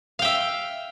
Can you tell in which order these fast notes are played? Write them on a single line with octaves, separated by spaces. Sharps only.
F5 G5 E5